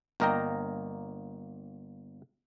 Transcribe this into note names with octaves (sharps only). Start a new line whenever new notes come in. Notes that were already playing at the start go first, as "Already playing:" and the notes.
G1 A#3 A#4 D#5 G5 A#5